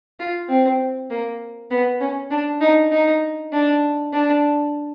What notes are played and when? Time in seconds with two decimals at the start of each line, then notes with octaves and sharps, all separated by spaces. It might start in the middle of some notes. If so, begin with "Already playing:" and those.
0.20 F4
0.49 C4
1.10 A#3
1.71 B3
2.01 C#4
2.31 D4
2.61 D#4
2.92 D#4
3.53 D4
4.13 D4